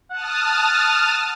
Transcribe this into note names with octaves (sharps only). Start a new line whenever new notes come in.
F#5 A5 D#6 F6